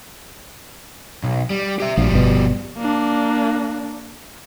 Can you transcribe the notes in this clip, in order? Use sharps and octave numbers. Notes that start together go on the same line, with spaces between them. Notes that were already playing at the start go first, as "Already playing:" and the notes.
B1
G3
G4 E5
A#1 F3 G3
G1 B2
A#3 D4